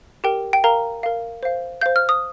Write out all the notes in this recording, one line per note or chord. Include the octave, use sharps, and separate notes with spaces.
G4 A#4 G5
G5
A#4 F5 A#5
A#4 F5
C5 F5
C5 F5 G6
F6
D#6